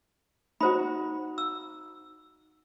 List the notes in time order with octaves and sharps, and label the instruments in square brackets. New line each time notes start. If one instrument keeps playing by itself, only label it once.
[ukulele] D#4 F#4 [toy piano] C5 B5
[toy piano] E6